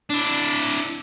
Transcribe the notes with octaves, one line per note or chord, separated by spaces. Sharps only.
D4 E4